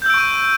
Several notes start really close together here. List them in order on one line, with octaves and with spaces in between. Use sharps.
G6 E6 D7 C#6 D#7